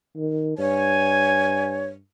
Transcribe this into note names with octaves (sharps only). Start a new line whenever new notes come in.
D#3
G2 C#5 G#5